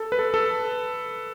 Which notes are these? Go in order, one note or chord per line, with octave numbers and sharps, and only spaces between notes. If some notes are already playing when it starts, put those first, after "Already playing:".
Already playing: A4
B4
A4
A4